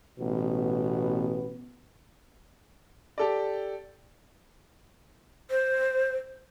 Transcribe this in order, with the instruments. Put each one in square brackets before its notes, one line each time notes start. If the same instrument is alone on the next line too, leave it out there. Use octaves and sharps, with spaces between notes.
[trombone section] A1 B2 B3
[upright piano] G4 A4 D5
[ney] C5